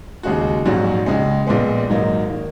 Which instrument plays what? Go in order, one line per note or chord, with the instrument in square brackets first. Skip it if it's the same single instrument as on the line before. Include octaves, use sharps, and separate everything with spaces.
[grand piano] D#2 C#3 G#3 D#4 F#4
A#1 G#2 F#3 C#4 F#4
C#2 C#3 G#3
A#1 A#2 G#3 B3
G#1 G#2 F#3 A#3 D#4
D#3 A#3